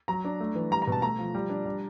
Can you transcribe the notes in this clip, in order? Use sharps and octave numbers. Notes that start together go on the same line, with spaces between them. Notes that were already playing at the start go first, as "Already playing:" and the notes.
F#3 A#5
D4
A3
E3
G3 A#5
A#5
B2 A5
A3 A#5
F3
G3
D4
G3